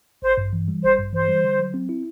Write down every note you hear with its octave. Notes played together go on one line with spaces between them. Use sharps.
A1 C5
G2
E3
G3
A1 C5
G2
E3 C5
G3
D3
F#3
C4
E4